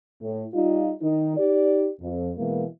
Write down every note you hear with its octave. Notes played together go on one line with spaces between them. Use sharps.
A2
G3 D#4 F4
D#3 D#4
D#4 G4 D5
F2
B2 E3 G#3 A#3